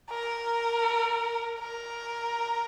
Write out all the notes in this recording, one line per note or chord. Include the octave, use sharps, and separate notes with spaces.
A#4
A#4